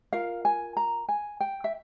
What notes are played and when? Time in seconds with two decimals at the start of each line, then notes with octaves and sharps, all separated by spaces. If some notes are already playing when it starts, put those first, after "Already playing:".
0.13 F4 A#4 F5
0.45 G#5
0.77 A#5
1.09 G#5
1.40 G5
1.64 E5